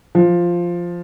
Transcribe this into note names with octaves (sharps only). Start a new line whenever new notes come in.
F3